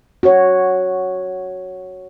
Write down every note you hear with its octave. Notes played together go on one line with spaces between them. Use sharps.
F#4 C#5